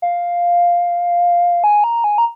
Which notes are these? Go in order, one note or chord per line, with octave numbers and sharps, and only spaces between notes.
F5
G#5
A#5
G#5
A#5